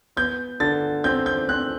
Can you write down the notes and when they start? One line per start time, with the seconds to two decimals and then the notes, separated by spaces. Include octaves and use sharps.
0.16 B3 G6
0.60 D3 A6
1.04 C4 G6
1.26 G6
1.49 C4 F#6